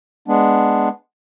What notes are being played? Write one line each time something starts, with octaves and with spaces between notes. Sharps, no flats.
G#3 B3 D4